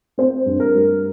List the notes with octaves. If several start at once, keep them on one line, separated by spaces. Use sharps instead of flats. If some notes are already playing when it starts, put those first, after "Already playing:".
C4 C5
G2
A#4
G3